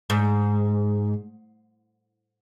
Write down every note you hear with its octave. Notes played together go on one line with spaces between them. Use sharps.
G#2